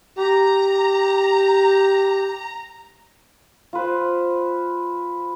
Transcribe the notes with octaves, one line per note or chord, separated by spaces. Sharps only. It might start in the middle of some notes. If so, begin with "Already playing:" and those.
G4 A#5
F4 B4 C5